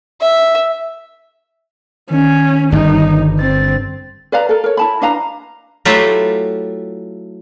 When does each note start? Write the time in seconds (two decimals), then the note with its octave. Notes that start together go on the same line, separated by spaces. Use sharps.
0.21 E5
2.10 D#3 C#4
2.72 G1 G2 D#4
3.39 C4 A6
4.32 B4 D5 F5 A#5
4.49 A4 A#4
4.64 A#4 C#5
4.77 E4 A5 B5
5.02 D4 B4 F5 A#5
5.85 F#3 A3 E4 F4 G4